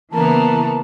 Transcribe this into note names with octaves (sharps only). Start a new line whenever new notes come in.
C#3 E3 A#3 B3 A5 A#5